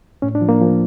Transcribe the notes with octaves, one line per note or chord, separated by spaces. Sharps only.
A2 C#4
D4
F3
A#3
F3